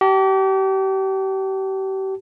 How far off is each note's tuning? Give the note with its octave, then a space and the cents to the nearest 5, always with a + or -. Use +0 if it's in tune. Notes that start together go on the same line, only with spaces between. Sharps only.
G4 -35 A5 -5